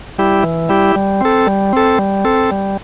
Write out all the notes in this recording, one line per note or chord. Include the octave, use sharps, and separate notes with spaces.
G3 E4 G4
E3
G3 E4 G4
G3
C4 A4
G3
C4 A4
G3
C4 A4
G3